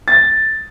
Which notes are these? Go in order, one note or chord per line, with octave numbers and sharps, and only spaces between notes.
A6